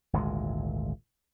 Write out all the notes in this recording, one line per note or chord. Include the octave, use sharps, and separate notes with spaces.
G#1 D2 A#2 G#3